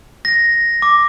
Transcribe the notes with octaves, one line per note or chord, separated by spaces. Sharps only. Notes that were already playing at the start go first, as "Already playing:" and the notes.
A#6
D6